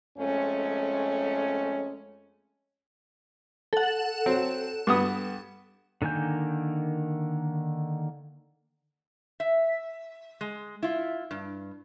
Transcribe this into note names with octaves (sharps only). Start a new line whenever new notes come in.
F2 G#3 A3 C#4
A4 F#5
F#3 C4
G2 B3 D#6
D3 D#3 A#3 G#5 G6
E5
G#3
E4 F4
G2